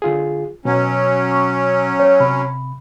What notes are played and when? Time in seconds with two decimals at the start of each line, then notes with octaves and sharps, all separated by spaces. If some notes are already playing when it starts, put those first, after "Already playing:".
0.02 D3 F4 G#4
0.65 B2 F#3 C#4
1.31 C#6
1.99 C#5
2.20 C3 B5